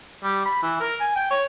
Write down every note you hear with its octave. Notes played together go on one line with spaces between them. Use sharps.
G3
B5
E3
A#4
G#5
G5
C#5